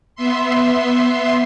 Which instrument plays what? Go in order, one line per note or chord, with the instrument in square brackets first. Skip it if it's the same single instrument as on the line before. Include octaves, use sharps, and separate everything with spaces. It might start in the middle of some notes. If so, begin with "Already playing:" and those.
[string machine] B3 E5 C6